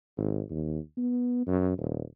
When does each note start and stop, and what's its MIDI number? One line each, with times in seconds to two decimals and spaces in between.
0.17 0.42 32
0.50 0.78 39
0.97 1.45 59
1.47 1.76 42
1.78 2.02 27